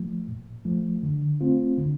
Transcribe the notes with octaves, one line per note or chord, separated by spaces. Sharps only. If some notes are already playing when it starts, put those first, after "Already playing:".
Already playing: F3 A3
A#2
F3 A3
D3
A3 C4 F4
D3